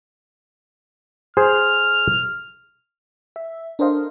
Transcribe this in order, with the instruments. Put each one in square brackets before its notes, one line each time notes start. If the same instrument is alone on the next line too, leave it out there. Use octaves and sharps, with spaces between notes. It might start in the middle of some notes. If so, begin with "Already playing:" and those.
[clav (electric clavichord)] G#4 C5 [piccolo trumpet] F6
[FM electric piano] E5
D4 A4 A#4 C5 D#5 F5